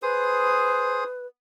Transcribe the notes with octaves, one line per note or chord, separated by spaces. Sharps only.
G#4 B4 C5 D#6